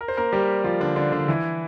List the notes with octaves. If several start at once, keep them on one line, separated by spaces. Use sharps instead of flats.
A#4
C5
A#3 A#4
G3 G4
F3 F4
D3 D4
D3 D4
D3 D4
E3 E4